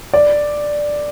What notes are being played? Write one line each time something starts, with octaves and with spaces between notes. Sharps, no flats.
D5